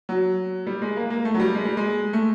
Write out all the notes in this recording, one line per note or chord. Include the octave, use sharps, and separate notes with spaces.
F#3
G3
G#3
A#3
A#3
A3
F#3
G3
G#3
G3
G#3
A3